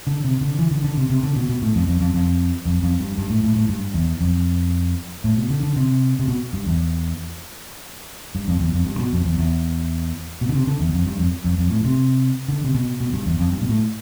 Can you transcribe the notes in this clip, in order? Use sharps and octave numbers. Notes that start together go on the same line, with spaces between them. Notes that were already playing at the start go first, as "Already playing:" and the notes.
D3
C3
D3
E3
D3
D3
C3
C3
D3
B2
B2
A2
F2
F2
F2
F2
F2
F2
G2
G2
A2
A2
A2
G2
E2
F2
A2
B2
D3
D3
C3
C3
B2
G2
E2
G2
F2
E2
F2
G2
B2
F2
E2
E2
B2
D3
C3
D3
E2
F2
G2
F2
F2
F2
A2
C3
D3
C3
B2
B2
G2
E2
F2
G2
B2
A2